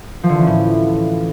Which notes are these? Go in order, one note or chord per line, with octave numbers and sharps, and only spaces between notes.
F3
D3
E3
C#4
A2